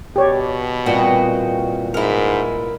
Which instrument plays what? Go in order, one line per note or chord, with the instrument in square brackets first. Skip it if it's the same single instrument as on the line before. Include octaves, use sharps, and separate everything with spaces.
[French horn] B2 [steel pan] G4 C#5 D5
[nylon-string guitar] A#2 E3 G3 [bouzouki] C4 F#4 D#5
[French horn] G#2 [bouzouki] E4 A#4